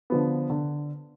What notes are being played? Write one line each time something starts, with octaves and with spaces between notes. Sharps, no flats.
D3 F3 B3
D3